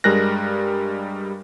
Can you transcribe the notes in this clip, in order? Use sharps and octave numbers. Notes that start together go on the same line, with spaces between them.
G2 G3 G#3 A#4 F#6 A#6